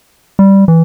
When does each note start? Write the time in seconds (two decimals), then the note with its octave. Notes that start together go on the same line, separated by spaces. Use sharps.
0.39 G3
0.68 E3